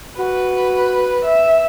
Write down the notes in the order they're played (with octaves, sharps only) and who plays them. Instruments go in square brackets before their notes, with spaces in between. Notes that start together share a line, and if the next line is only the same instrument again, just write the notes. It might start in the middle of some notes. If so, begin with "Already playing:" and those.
[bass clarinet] F#4 [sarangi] B4
[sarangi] E5